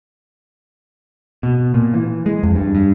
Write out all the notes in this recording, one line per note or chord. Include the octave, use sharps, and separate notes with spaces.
B2
A#2
E3
G#3
F2
G2
G2